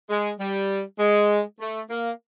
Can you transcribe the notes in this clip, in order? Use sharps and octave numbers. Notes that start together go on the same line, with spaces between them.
G#3
G3
G#3
A3
A#3